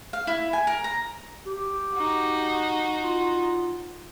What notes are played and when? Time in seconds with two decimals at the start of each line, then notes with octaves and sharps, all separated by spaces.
0.13 F5
0.27 E4
0.53 G#5
0.67 A#4
0.84 A#5
1.46 G4
1.94 D#4 F#4
3.01 F4